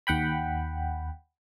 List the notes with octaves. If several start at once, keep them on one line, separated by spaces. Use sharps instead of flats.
D#2 F#5 G5 B5